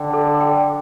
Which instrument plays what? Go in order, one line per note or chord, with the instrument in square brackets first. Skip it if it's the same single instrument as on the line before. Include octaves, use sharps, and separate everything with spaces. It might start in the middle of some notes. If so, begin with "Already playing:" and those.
Already playing: [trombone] D3 [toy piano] G5
[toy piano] A4
G5